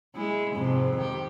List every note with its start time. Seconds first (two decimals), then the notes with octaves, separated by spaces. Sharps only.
0.16 G#3 E4
0.55 F2 G#2 C3
0.97 D#3 G4